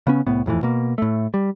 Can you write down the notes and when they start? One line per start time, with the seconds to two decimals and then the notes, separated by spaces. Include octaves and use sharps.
0.07 C#3 B3 C#4
0.27 C2 A2 B3
0.46 D#1 F2 A2 E3
0.63 B2 A#3
0.98 A2 A3
1.34 G3